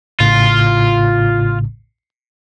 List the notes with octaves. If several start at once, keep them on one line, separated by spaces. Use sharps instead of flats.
A1 A2 C#3 F4